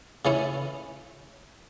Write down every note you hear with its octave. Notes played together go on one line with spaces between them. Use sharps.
C#3 E3 A3 C#4 E4